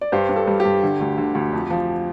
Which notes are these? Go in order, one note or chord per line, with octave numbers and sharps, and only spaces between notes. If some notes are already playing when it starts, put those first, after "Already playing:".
D5
G2 G4 C5
G2
A4
G3
G4
G2
D3
D2
D3
D2
F2
F3